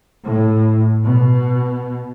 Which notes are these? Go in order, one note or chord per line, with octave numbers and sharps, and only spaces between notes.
A2
B2